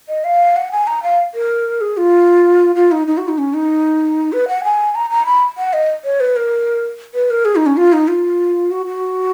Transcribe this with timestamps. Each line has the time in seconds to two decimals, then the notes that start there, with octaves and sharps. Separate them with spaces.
0.09 D#5
0.24 F5
0.56 F#5
0.72 G#5
0.87 A#5
1.03 F5
1.35 A#4
1.81 G#4
1.97 F4
2.76 F4
2.92 D#4
3.07 D#4
3.18 F#4
3.28 D#4
3.38 C#4
3.54 D#4
4.33 B4
4.48 F#5
4.64 G#5
4.95 A#5
5.10 A#5
5.26 B5
5.58 F#5
5.73 D#5
6.05 C#5
6.20 B4
6.36 A#4
7.14 B4
7.30 A#4
7.45 G#4
7.56 D#4
7.66 C#4
7.77 F4
7.93 D#4
8.08 F4
8.71 F#4
8.86 F#4